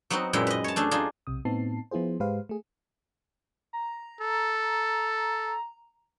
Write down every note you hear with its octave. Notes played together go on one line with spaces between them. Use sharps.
F#3 B3 C4 D#4 F#4
F#2 A#2 G#3 E4 G5
B4 D#5
C#5 A5
A3 D4 G#4
D4 D#4 F4 G#4
B1 C3 D#6
A2 B3 C4 D#4 A5 C7
F3 B3 E4 F4 G#4 C5
G#2 G#3 G4 B4 C5 F5
A3 G#4
A#5
A4